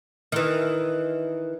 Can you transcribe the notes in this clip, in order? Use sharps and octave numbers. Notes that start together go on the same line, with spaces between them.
D#3 E3